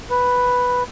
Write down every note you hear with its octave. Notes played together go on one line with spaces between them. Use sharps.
B4